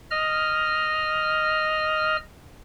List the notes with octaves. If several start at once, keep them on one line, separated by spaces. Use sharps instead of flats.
D#5 F6